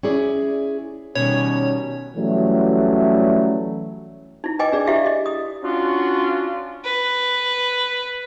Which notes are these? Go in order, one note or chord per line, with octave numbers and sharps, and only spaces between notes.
C#4 E4 G#4 D5
B2 D#3 G3 C#4 C#5
E3 F#3 G3 A3 C#4
D#4 E4
B4 D#5 G5 G#5 D6
D4 G#4 D5
E4 G4 E5 F5
D#5
D#6
C#4 D4 F4 F#4
B4